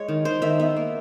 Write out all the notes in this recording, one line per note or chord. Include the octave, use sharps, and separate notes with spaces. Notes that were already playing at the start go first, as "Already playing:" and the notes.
Already playing: G#3 C#5
D#3
D#3 C5
D#3 E5
B3 E5
A#3